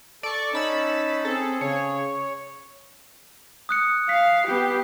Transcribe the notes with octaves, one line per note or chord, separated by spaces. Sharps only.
A4 D5 C#6
C#4 D#4 A5 B5 E6
C4 G#4 A4
C#3 C#5
D#6 F#6 C#7
F5 B6
B3 G4 C7